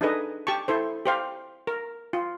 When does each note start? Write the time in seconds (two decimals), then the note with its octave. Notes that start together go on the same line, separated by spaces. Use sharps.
0.01 D4 D#4 G#4 A4 B4 D#5
0.47 G4 A5 C#6
0.68 E4 A4 C5
1.06 G4 C5 F5
1.67 A#4
2.13 F4